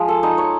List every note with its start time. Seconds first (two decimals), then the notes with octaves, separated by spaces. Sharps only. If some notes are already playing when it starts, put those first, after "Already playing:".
Already playing: F3 G#3
0.08 A4
0.23 D#4
0.38 C#5